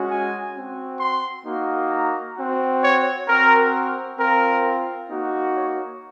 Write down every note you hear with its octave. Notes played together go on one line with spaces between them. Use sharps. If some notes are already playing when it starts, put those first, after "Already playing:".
Already playing: G#3 C#4 F#4
G#5
C4 F#4
C6
A#3 D#4 F#4
A#5
C4 F#4
C#5
C4 F#4 A#4
C4 F4 A#4
A#3 D#4 F#4
C#5